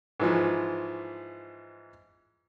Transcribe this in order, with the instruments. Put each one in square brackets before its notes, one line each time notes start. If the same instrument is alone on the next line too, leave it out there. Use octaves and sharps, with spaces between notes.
[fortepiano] G#2 E3 F3